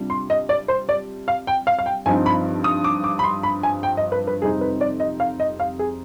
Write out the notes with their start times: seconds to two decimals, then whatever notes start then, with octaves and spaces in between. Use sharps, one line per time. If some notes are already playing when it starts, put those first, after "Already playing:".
Already playing: C3 G3 D4 F4
0.10 C6
0.30 D#5
0.49 D5
0.68 C5
0.89 D5
1.28 F5
1.47 G5
1.67 F5
1.79 F5
1.86 G5
2.06 G2 F3 C4 D#4 G#5
2.26 B5
2.64 D#6
2.84 D6
3.04 D6
3.19 B5
3.24 C6
3.43 B5
3.63 G#5
3.83 G5
3.97 D#5
4.12 B4
4.27 B4
4.42 F2 C3 G3 C4 D#4 G#4
4.61 B4
4.81 D5
5.00 D#5
5.20 F5
5.40 D#5
5.60 F5
5.79 G#4